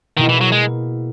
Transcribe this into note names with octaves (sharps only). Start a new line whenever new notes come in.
B2 D#3 A#3 E4 G#4
E3
F#3
G#3